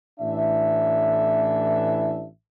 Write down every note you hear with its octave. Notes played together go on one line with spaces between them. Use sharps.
A1 A2 E3 D4 E5